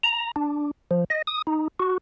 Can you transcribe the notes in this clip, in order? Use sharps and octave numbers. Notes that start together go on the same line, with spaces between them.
A#5
D4
F3
D#5
D#6
D#4
F#4